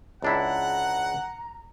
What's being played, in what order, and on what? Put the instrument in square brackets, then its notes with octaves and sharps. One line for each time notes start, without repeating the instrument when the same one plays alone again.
[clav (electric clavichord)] C#2 D4 E4 [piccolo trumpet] F#5 [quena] A#5